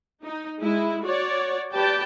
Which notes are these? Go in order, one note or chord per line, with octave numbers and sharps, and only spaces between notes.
D#4
G#3 E4
F#4 C#5 D5
G4 B4 D5 G5 A5